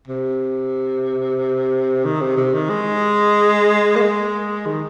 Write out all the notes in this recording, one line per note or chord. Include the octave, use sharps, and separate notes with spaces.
C3
D#3
C3
C3
D#3
G#3
A#3
G#3
D#3